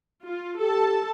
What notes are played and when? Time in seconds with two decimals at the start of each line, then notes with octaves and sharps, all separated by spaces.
0.24 F4
0.60 G4 A4 A5